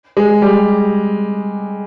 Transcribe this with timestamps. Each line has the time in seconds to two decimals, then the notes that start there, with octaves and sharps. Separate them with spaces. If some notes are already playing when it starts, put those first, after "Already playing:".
0.17 G#3
0.42 G3